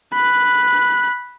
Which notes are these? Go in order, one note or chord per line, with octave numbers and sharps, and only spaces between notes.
B5 F#6